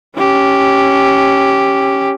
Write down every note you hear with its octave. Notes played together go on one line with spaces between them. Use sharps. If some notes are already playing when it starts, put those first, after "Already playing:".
C#4 G4